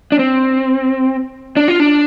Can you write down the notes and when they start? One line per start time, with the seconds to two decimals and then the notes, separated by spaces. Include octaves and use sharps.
0.12 D4
0.19 C4
1.57 D4
1.68 F4
1.80 D4